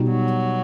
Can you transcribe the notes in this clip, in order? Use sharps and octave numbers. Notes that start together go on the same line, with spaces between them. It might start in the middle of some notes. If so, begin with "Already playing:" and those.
Already playing: B2 G3 D#4 F#4
F#3